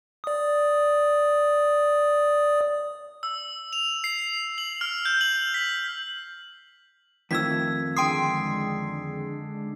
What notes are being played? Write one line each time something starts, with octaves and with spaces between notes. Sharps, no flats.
D5 D#6
E6
F7
C7
F#7
F6
G6
F#7
B6
F2 D#3 F3 A3 E6 G#6 B6
D3 G#3 D4 G5 C6 D#6 C7 D7